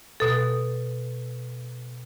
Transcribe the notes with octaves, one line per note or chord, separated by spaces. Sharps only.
B2 A4